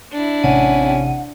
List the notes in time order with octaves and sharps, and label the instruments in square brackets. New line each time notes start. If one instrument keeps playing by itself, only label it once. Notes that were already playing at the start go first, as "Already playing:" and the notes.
[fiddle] D4 E4
[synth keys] A1 C3 D#7 [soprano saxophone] C#4 [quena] F#5